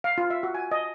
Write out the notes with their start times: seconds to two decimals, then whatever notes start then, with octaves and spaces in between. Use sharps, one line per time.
0.04 F5
0.18 F4
0.30 E5
0.43 F#4
0.55 G#5
0.72 D#5